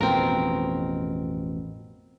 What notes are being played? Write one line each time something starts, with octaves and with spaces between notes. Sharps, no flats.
A1 F2 B2 C4 A#4